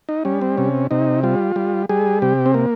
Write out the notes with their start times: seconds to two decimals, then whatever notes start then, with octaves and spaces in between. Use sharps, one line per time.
0.09 D#4
0.25 G3 C#4
0.41 C4
0.57 C3 C#4
0.91 C3 D#4
1.23 G3 F4
1.56 G3
1.89 G3 G#4
2.22 C3 G4
2.46 C4
2.54 A#3